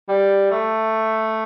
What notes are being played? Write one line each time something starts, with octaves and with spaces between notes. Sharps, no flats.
G3
A3